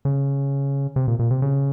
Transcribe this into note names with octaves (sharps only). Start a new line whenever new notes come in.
C#3
C3
A#2
A#2
C3
C#3